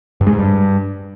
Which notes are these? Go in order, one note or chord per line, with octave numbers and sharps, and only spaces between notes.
G2
G#3
G#2
G2